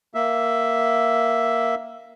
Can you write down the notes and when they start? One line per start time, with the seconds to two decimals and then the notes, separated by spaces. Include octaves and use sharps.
0.14 A#3 E5